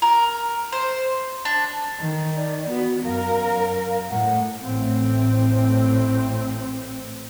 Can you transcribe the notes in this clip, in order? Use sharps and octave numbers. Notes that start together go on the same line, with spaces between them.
A#4
C5
D4
D#3
D5
B3 F#4
F#2 A#4 F5
A2 F#5
A1 A2 C4